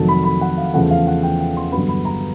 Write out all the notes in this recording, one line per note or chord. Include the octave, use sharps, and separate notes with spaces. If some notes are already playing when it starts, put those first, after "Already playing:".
Already playing: F2 C3 D#3 F#3 A3 A5
B5
B5
F#5
F5
E2 C#3 F3 A3 F#5
F5
F#5
G5
G5
C6
G2 D3 F#3 B3 B5
B5
A#5